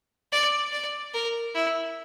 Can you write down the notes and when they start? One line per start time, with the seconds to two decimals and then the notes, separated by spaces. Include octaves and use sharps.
0.32 D5
0.72 D5
1.14 A#4
1.55 E4